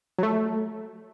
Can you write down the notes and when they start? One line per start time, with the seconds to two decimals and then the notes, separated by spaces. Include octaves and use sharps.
0.18 F#3
0.23 A3